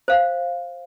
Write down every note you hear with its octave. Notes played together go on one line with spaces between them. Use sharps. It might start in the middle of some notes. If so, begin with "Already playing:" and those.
C5 F5